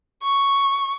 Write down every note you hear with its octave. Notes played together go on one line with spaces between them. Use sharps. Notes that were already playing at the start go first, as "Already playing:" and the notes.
C#6